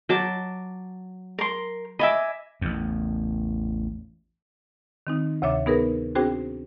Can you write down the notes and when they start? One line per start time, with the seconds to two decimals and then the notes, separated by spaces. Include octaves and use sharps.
0.09 F#3 A5 D6
1.39 A#4 C6
1.99 D#5 E5 G#5 B5 D6
2.61 A1 E2
5.07 D#3 C4 D#4
5.42 D2 C3 C#5 E5 D6
5.66 B3 D#4 G#4 A#4 B4
6.15 C4 D4 F#4 G#4 C5 G5